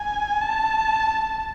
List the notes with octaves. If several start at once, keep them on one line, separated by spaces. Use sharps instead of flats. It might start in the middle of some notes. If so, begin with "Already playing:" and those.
Already playing: G#5
A5